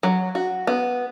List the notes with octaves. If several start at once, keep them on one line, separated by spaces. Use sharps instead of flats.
F#3
F#4
B3